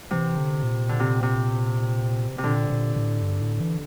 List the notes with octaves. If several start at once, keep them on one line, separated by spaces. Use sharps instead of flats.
C3 E3
D3
A#2
D3
C3
C3
C3
A#2 D3
A#2
A2
G2
A2
E3